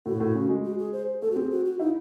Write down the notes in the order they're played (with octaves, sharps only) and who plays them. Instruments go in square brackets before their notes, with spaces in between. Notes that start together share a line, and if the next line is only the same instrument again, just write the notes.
[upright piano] A2 [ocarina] F#4
[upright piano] A2
C#3
G#3
[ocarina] F#4
G#4
C5
[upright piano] A3 [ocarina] A4
[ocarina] F#4
[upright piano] C4 [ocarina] G#4
[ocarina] F#4
F#4
[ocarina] D#4 [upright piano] E4